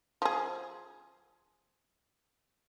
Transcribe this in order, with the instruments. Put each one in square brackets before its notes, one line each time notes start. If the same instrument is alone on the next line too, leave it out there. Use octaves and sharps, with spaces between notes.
[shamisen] F3 G#4